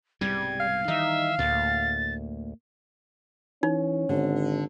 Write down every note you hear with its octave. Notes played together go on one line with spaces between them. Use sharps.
C2 G#2 B2 G3 G#6
F5
D#3 E3 G3 D#4 E5
D2 A2 A#3 A6
E3 C#4 D#4
G#1 D3